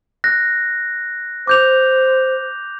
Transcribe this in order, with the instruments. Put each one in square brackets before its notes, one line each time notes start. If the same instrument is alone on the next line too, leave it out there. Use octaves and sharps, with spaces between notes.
[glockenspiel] F#6 A#6
[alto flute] C5 [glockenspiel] D6 G6 F7